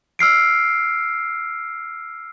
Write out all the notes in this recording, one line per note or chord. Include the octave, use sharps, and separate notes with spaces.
E6 F6 C7 D7